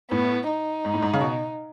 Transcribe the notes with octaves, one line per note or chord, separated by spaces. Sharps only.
A2 B3
D#4
G#2
A2
G#2
C#3
B2